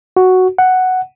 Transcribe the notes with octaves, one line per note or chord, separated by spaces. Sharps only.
F#4
F#5